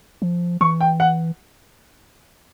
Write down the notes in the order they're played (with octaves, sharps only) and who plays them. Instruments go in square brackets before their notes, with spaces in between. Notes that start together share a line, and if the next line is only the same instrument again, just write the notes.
[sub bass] F3
[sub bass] E3 [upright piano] C#6
[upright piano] G5
F#5